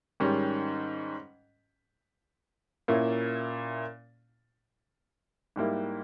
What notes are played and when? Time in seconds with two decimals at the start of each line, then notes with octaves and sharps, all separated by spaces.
0.20 G#2 D#3 G3 C#4
2.88 A#2 A#3 C#4 E4
5.56 G#2 G3 A#3 E4